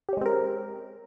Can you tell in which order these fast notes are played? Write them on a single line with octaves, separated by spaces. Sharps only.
G4 C#4 G#3 C4 A#4